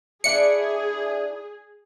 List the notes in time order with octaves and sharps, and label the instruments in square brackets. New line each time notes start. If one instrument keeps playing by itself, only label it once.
[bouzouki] D4 E4 D5 [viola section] G#4 [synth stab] C#7